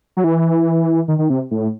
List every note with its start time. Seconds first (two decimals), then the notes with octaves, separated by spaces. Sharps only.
0.17 F#3
0.24 E3
1.08 D#3
1.19 D#3
1.30 C3
1.51 A2